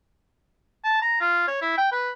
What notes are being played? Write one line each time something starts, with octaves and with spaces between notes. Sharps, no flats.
A5
A#5
F4
C#5
E4
G5
B4